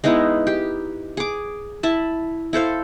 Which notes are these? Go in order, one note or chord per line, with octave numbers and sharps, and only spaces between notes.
G#3 B3 D#4 E4
G4
G#4 D6
E4 E5 A5
E4 A4 C5 F5